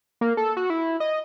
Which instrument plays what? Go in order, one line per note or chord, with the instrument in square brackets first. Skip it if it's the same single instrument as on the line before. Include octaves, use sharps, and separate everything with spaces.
[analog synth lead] A#3
A4
F#4
E4
D#5